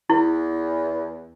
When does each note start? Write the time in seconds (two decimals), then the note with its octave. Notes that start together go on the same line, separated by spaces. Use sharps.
0.10 E2 E4